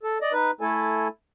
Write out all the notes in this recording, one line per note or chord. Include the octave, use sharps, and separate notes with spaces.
A4
D5 D#5
D#4 B4
A3 E4 A4 G#5